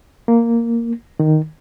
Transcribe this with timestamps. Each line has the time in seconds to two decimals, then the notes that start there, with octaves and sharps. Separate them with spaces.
0.28 A#3
1.20 D#3